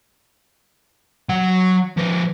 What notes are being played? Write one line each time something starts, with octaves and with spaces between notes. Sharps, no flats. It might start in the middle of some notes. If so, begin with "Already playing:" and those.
F#3 F#5
F3 B4